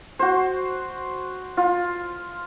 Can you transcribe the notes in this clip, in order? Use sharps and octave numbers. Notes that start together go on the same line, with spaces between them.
F#4 C5
F4